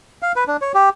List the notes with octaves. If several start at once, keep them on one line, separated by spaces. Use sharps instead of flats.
F5
B4
D4
C#5
G4